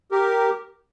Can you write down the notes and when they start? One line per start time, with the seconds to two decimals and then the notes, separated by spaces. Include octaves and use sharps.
0.11 G4 A#4